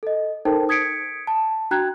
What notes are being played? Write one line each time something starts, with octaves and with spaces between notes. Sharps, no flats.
A4 D#5
D#4 A4 A#4 C5 G5 A5
D#6 G#6 B6 C#7 D7
A5
D4 F#4 G5 A#5 F#6 G#6